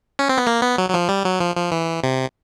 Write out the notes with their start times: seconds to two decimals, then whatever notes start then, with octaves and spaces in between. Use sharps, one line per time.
0.19 C#4
0.29 C4
0.38 B3
0.47 A#3
0.62 B3
0.78 F#3
0.90 F#3
0.94 F3
1.09 G3
1.25 F#3
1.40 F3
1.56 F3
1.72 E3
2.04 C3